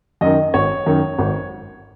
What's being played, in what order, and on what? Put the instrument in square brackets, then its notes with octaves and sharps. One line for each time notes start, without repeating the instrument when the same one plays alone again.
[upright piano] F#2 D#3 D#5
G#1 C#5
F#2 D#3
G#1